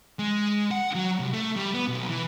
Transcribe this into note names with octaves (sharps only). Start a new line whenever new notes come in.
G#3
F#5
F#3
C2
A3
G3
B3
B1
E3